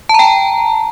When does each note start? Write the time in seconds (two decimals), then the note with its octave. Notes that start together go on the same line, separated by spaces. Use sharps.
0.09 A5
0.14 A#5
0.19 G5